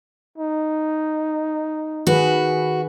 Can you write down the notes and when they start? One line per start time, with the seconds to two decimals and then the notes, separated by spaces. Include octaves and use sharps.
0.38 D#4
2.07 D#3 F#4 G#4 B4